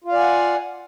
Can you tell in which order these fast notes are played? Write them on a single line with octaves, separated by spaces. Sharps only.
F4 F5 D5 G#5 F#5